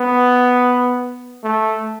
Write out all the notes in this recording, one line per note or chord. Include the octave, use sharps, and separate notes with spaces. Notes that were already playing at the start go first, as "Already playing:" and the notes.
Already playing: B3
A3